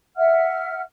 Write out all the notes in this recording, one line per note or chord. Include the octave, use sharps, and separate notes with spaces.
E5 F#5 F6